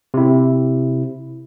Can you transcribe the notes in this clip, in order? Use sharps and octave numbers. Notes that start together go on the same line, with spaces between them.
C3 E4